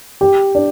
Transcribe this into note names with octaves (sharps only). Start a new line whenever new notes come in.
G4
D4